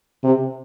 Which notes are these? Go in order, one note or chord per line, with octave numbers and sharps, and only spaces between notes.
C3